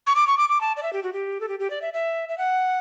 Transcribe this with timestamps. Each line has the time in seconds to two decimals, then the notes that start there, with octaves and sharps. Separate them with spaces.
0.07 C#6
0.15 D6
0.27 C#6
0.38 D6
0.49 D6
0.61 A5
0.77 D5
0.83 E5
0.93 G4
1.03 F#4
1.13 G4
1.41 A4
1.49 G4
1.59 G4
1.70 D5
1.82 E5
1.94 E5
2.29 E5
2.38 F#5